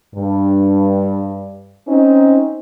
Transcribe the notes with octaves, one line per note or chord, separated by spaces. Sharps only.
G2
C4 C#4 D#4